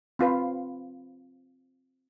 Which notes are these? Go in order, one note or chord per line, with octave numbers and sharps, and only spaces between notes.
C4 F4 B4 F5